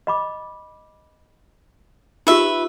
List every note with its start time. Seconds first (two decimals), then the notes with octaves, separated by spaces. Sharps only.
0.07 D#5 B5 D6
2.27 D#4 F4 G4 B4 E5